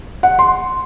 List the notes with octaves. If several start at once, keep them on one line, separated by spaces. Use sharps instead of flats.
F#5
C6